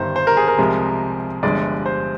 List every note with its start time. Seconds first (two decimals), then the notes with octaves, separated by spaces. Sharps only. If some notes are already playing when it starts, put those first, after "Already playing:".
Already playing: G1 G2 D#3 C5
0.16 C5
0.27 A#4
0.37 G#4
0.48 A#4
0.58 C2 C3 F3 G#3
1.43 G1 G2 F3 G#3 D5
1.86 C5